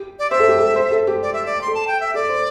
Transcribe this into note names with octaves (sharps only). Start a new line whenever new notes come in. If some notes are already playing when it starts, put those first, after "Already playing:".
Already playing: G4
D5
C5 E5
A4
G4
A4
C5
A4
G4
D5
E5
D5
C6
A4
A5
G5
E5
A4 D5
C5